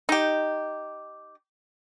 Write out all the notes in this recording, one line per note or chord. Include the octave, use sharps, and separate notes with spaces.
D#4 G4